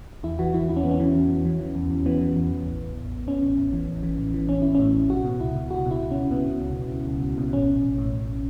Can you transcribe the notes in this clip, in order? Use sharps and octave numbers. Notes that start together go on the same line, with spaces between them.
E2 E4
E3 F#4
E3 E4
E2 E4
C#4
E2 B3
C#4
E3
E2
E2
E3
E3
E2
E2
E3 B3
E3
E2
E2
A1
A1
A1
A1
A1 C#4
A1
A1
E3
A1
E3
A1
E3
A1 C#4
A1 E4
A2 C#4
A1
B2 F#4
B2
C#2 E4
B2
C#2 F#4
B2
E4
B2
C#4
C#2
B2 B3
B2
C#2
C#2
B2
C#2
C#2
B2
A1 C#4
A1
A1
A2
A1